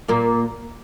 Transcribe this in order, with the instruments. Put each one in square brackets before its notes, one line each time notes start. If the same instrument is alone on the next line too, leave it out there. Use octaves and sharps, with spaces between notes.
[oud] A#2 A#3